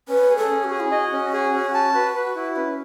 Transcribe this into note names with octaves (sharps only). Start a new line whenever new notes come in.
C#4 B4
G#4
A4
C#4
F#4
G#4
E4
F#4 D#5
C#4
G#4
C#4
A5
B4
B4
E4
C#4 B4